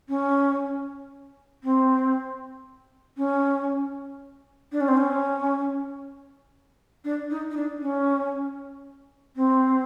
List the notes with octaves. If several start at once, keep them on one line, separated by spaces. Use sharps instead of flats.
C#4
C4
C#4
D4
C#4
C4
C#4
D4
D#4
D#4
D4
C#4
C4